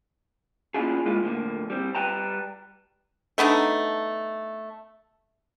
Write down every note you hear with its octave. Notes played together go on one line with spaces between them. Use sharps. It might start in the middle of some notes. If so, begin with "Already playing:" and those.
A#3 C#4 D4 E4 F4 G#4
G#3 A#3 E4 F4
F2 A2 D3 A#3
G3 C4
G3 B4 G5 A5 A#5
A3 B3 D4 D#4